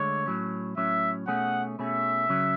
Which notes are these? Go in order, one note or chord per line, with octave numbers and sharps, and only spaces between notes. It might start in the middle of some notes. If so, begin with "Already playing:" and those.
Already playing: D2 D3 G#3 C#5
A2 F#3 C#4
A2 F#3 C#4 E5
B2 A3 C#4 G#4 F#5
B2 A3 C#4 G#4 E5
C#3 F#3 C#4